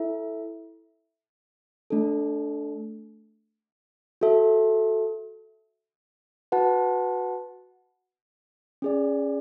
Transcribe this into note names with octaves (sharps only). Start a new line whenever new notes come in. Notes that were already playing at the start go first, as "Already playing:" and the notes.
Already playing: E4 A4 E5
A3 D4 A4
F#4 A4 E5
F#4 B4 F#5 A5
C#4 G#4 D5